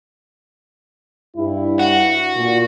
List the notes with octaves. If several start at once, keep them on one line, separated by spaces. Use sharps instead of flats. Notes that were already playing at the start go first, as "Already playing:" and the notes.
G2 E4
F#4
A#2